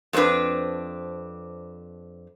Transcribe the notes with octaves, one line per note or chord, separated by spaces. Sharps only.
F2 A3 C4 D4 B4